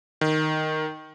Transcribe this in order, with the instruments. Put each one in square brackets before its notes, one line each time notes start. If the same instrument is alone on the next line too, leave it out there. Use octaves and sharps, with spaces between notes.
[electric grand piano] D#3